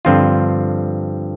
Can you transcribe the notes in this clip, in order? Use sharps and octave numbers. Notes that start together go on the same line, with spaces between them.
G2 D3 F3 C4 F4